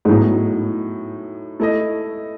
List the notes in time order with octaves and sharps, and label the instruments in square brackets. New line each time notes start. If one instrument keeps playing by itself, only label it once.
[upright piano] G#2
[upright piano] A2 [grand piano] F#3 B3 D#4 G#4
[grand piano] A3 E4 A4 D#5